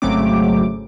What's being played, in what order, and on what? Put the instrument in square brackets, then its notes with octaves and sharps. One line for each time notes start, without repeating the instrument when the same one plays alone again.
[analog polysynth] G#1 C#3 F#3 A3 C4 D6